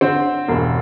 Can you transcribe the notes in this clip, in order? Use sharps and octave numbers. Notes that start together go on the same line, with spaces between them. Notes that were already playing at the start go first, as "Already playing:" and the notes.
D3 C4 C5
E1